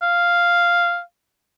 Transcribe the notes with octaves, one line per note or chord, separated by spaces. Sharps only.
F5